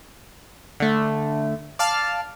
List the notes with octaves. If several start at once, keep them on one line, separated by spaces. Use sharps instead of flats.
D3 A3
D5 F5 A5 F6